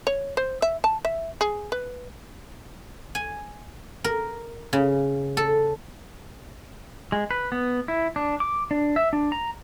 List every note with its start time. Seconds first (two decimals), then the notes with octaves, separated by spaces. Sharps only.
0.07 C#5
0.37 C5
0.62 E5
0.84 A5
1.05 E5
1.41 G#4
1.72 B4
3.15 G#5
4.04 A#4
4.73 C#3
5.37 A4
7.12 G#3
7.31 B4
7.52 B3
7.88 E4
8.16 D4
8.40 D6
8.71 D4
8.96 E5
9.13 D4
9.32 A#5